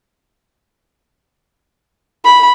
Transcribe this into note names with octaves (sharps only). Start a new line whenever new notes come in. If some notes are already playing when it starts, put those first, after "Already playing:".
B5